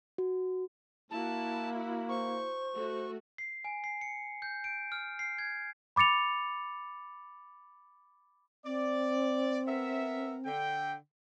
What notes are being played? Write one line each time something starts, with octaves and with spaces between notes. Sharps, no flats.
F#4
A#3 E4 F#4 A5
C5 C#6
A3 F#4
C7
G#5
C7
C#7
G6
D7
F6
C7
G#6
B5 D6 A6 C#7 F7
C4 D5
B3 A#4 E5
D3 G5